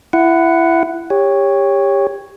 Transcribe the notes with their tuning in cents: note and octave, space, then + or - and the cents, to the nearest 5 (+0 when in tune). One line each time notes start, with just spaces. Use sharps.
E4 +20 F#5 +0
G4 +25 C#5 +0